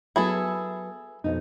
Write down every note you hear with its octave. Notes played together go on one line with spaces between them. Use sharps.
F#3 B3 E4 G#4 A4
F2 B2 D#4